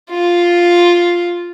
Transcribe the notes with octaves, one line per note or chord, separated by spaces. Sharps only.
F4